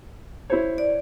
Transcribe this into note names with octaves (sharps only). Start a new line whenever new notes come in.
E4 C5 C#5
D5